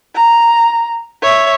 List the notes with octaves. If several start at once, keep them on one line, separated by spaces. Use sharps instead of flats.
A#5
C#5 E5